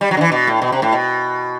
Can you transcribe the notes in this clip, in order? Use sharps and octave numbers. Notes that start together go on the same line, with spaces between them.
G3
F#3
D3
E3
B2
A2
B2
C3
A2
B2